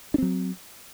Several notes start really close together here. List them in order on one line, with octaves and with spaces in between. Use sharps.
D4 C4 F#3